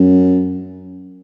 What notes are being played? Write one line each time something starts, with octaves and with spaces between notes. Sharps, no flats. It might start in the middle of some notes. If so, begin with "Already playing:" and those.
Already playing: F#2